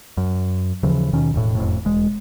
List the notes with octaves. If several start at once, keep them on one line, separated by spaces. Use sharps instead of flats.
F#2
D#2 C#3 E3 F3
D#2 B2 D#3 C#4
E1 A2
F#1 F2 A2
E1 G#3